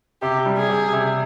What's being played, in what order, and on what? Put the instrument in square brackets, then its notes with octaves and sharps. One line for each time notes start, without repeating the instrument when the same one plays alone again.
[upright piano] C3 [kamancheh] G4
[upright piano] G3
[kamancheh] G#4
[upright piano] C3
C3